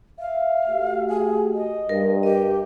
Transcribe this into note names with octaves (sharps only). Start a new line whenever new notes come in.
E5 F5
A3 F#4 G4
G#4
D#5
G2 A#4
G4 D#5